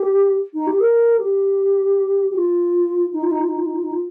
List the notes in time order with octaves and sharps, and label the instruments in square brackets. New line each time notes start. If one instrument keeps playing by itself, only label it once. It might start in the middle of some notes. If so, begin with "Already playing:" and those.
Already playing: [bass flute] G4
D#4
G4
A#4
G4
G4
F4
D#4
F4
D#4
F4
D#4
F4
D#4
F4
D#4
F4